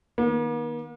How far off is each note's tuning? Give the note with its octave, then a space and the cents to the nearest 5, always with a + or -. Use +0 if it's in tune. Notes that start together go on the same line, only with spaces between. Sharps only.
D#3 +0 A#3 +45